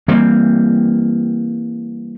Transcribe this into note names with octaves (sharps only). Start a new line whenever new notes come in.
E3 G3 A#3 C4